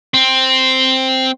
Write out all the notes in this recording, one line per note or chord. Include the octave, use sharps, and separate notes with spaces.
C4